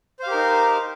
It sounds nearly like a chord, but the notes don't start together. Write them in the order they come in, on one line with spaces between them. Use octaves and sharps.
C5 F5 G4 A#4 D#4